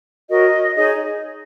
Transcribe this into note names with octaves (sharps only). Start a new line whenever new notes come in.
F#4 A#4 C#5 D#5
D#4 G#4 C#5 D#5